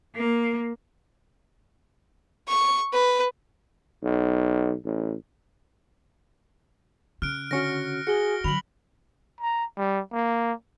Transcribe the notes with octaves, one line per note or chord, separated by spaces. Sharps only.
A#3
C#6
B4
B1
A1
C#3 F6 F#6 D7
D3 C#4 F#4 A#6 C#7
F#4 G#4 C#7 G7
D3 F#3 B5 F7 F#7
A#5
G3
A#3